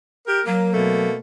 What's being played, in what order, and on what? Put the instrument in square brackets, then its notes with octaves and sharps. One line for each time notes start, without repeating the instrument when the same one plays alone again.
[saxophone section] G4 A#4
[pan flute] F#3 [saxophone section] A#3
[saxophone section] B2 A3 A#3